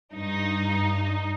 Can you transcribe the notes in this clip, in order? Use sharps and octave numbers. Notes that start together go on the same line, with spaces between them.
G2 D#4